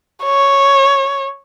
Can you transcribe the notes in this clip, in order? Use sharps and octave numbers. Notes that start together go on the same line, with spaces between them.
C#5